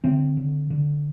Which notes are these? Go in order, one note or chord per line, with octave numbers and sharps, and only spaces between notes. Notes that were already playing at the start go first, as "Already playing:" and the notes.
D3 C4
D3
D3